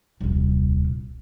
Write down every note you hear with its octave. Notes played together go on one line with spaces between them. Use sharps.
D#1 C2